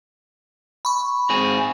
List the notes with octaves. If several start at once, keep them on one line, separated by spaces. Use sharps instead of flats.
B5 C#6
G#2 C4 G#4